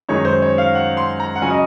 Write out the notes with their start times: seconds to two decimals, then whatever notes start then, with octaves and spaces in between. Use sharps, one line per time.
0.09 F#2 D#3 G#3 D#4 C#5
0.25 C5
0.42 C#5
0.58 F5
0.75 F#5
0.97 C6
1.20 A#5
1.36 F#5
1.42 C#3 F#3 C#4 G#5
1.50 D#5